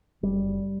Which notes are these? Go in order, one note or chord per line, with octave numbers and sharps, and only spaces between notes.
F#1 G3